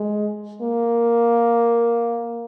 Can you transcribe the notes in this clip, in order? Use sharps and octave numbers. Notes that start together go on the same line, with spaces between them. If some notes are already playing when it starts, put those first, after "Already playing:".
Already playing: G#3
A#3